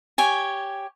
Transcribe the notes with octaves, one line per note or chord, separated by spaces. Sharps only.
G4 C#5 G#5